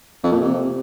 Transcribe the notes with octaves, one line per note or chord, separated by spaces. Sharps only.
F2
A#2
C3